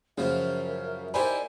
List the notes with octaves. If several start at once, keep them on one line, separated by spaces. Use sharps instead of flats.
F#2 C#3 F3 F#3 A#4 E5
D#4 E4 G4 C5 D5 G#5 B5